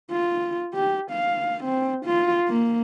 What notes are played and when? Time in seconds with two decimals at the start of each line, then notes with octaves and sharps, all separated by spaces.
0.12 F4
0.74 G4
1.11 F5
1.64 C4
2.06 F4
2.48 A#3